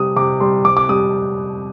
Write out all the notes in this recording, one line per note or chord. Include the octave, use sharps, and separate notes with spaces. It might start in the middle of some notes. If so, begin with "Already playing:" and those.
Already playing: C3 G3 D#6
C3 D6
G3 C6
C3 D6
D6
G3 D#6